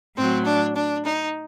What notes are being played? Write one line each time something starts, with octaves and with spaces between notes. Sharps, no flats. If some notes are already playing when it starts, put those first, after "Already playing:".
A2 F#3 C4
D4
D4
D#4